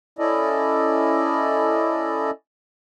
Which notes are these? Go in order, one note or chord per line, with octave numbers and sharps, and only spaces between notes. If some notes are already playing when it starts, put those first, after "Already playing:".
C#4 E4 A4 D5 D#5